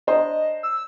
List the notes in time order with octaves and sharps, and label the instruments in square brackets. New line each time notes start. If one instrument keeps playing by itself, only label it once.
[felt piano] D4 C5 A#5 [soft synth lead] D#5
[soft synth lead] E6